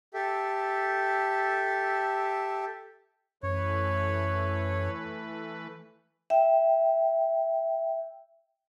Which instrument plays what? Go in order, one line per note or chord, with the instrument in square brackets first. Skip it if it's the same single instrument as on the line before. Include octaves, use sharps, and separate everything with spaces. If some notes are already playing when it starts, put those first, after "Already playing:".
[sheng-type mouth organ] G4 A4 E5
[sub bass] F#2 [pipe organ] E3 A3 B4 [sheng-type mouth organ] C#5
[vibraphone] E5 G5